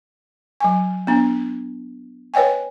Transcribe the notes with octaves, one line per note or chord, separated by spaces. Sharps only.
F#3 G#5
B3 D4
B4 C#5 D#5 G5 G#5